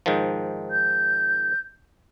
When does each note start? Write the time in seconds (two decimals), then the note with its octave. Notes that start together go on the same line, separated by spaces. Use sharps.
0.06 G#2 D#3 F3
0.71 G6